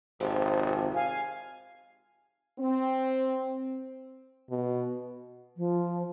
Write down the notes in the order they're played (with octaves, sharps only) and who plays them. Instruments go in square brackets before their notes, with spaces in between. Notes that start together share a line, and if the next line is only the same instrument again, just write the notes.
[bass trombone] G#1 [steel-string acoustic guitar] F2 C3 F3
[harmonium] F5 G#5
[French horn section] C4
[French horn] B2
[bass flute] F3